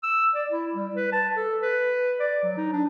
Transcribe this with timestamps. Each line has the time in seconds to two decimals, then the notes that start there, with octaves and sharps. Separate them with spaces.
0.03 E6
0.35 D5
0.50 E4
0.75 G3
0.95 B4
1.12 A5
1.36 A4
1.62 B4
2.20 D5
2.43 F#3
2.57 D#4
2.73 D4